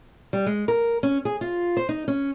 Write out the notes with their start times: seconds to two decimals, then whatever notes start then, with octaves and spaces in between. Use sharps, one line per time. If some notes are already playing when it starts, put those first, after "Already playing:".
0.33 G3
0.47 G#3
0.68 A#4
1.03 C#4
1.25 G#4
1.41 F4
1.77 C5
1.89 D#4
2.08 C#4